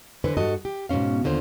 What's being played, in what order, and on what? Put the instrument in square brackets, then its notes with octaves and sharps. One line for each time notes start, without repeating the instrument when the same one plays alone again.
[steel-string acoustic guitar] D3 E3 B4 C5 G#5
G2 F#4 A4 D#5
G4
G#2 B2 A#3 C#4 F5
D#2 D3 F4 C5